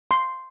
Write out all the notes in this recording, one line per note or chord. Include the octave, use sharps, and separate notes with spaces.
C6